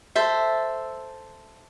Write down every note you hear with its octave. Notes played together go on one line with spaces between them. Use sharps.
A4 C5 E5